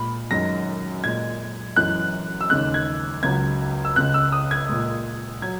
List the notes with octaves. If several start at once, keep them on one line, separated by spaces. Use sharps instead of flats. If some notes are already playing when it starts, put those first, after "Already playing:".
Already playing: A#2 G#3 B5
F#2 D#3 G#3 A#6
A#2 G#3 G#6
F#2 E3 G#3 F#6
E6
D#2 C#3 G#3 F#6
G#6
C#2 C#3 F#3 G#6
E6
C#2 C#3 G#3 F#6
E6
D#6
G#6
A#2 G#3
F#3 G#6